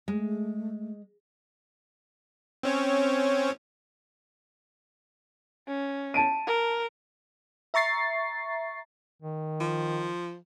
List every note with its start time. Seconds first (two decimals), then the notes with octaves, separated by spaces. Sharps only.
0.08 G#3 A3
2.63 C4 C#4 C#5
5.68 C#4
6.14 A5 D7 D#7
6.46 A#4
7.74 E5 A#5 C#6 A6 C7
9.22 D#3
9.61 F3